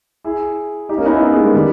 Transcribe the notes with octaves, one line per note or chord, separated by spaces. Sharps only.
E4 G#4
D#4 G4
A#3 C#4
B3 D#4
C#4 E4
B3 D#4
G#3 B3
G3 A#3
D#3 G3